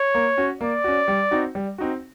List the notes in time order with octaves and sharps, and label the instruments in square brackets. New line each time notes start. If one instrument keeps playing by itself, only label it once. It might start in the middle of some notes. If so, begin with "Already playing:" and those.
Already playing: [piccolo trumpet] C#5
[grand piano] A#3
C#4 F#4
[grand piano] A#3 [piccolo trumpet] D5
[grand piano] C#4 F#4
G3
C4 D#4 F#4
G3
C4 D#4 F#4